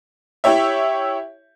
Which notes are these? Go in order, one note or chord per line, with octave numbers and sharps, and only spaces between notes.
E4 G4 C#5 E5